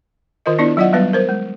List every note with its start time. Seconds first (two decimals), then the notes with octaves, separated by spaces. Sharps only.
0.46 D#3 F4 A#4 D#5
0.59 B3 D4 E4 D5
0.77 F#3 F4 D5 D#5 F#5
0.93 F#3 G3 B3 B4
1.13 A#4 C5
1.29 G#3